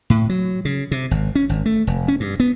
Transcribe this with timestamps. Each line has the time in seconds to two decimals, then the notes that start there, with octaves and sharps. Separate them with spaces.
0.10 A2
0.29 F#3
0.65 C#3
0.91 C3
1.11 G#1
1.35 C#4
1.49 G#1
1.66 A3
1.87 F1
2.08 C#4
2.20 G2
2.40 B3